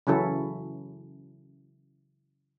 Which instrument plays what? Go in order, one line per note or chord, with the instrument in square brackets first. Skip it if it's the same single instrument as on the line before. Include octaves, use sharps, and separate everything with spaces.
[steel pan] C#3 E3 F#3 C#4 E4 A4